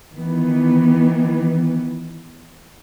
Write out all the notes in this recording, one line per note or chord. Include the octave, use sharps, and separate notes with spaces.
D#3 E3 B3